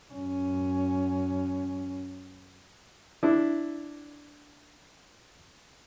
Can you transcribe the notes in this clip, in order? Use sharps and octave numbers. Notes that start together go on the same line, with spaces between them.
F#2 C#4
D4 E4